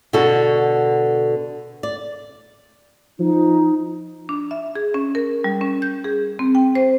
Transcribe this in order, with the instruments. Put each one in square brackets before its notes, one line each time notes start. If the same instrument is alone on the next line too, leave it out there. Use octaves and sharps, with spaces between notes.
[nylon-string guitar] B2 D3 B3 F#4 A4
D5
[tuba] F3 [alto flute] D#4
[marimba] D4
E5
G#4
C#4
A#4
G3
C#4
G6
G#4
C4
G5
C5